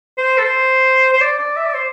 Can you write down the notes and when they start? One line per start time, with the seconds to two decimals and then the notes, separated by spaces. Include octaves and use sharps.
0.18 C5
0.38 A4
0.45 C5
1.13 C5
1.21 D5
1.39 D5
1.57 E5
1.66 D5
1.74 C5